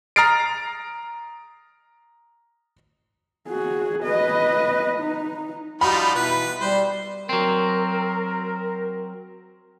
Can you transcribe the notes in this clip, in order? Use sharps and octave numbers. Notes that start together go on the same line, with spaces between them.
A#5 D#6 F6 A6 C7 D7
F#4 G#4
B4 D#5
D#4
F3 G3 D#4 F4 F#4 B5
B2 E3 B4
G3 C5
F#3 C4 A#4